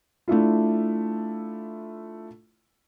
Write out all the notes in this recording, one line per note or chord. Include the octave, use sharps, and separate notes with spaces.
A3 D4 E4 F4